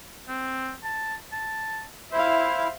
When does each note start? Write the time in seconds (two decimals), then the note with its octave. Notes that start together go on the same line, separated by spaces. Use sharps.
0.28 C4
0.83 A5
1.32 A5
2.12 E4 C5 E5 F5